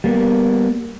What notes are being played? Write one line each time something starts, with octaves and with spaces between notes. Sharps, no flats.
G3 A#3 B3